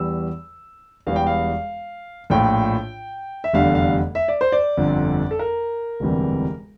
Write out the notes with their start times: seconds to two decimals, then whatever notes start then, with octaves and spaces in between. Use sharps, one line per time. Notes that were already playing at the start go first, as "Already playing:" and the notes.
Already playing: E2 E3 G3 E6
1.07 E1 E2 E3 G3 F5
1.16 G5
1.27 F5
2.30 A#1 A2 F3 G5
3.44 E5
3.53 F1 E2 D3 G3 F5
3.75 F5
4.15 E5
4.28 D5
4.41 C5
4.52 D5
4.77 G1 F2 D3
5.31 A4
5.39 A#4
6.00 E1 D2 C3 E3 G3